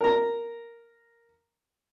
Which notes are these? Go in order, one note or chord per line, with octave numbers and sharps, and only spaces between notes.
A#4 A#5